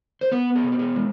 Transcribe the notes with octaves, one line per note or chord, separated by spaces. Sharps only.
C5
B3 B4
G#4
B2
G4
G#4
G#3